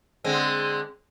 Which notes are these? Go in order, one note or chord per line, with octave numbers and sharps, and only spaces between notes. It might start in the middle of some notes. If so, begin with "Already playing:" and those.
D3 G#3 C4